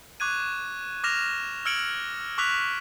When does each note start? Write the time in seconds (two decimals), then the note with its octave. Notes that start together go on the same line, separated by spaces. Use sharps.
0.20 C#6 D6 F#6 G#6 D#7
1.04 D6 F6 A#6 E7 F7
1.65 E6 F6 G#6 C#7 D7 F#7
2.38 C#6 D6 E6 F#6 B6 F7